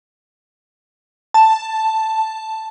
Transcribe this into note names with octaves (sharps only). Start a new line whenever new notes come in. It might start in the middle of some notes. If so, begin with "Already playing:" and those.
A5